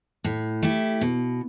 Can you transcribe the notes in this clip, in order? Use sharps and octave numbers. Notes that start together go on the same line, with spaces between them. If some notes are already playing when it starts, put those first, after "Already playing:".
A2
A3 E4 G4
B2